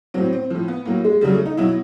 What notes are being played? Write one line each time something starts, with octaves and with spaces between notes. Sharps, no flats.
A2 F#3 C4
C4
A2 F3
B3
A2 F#3 A#3
G#3
C#3 F#3 G3
A3
D#4
B2 F#3 E4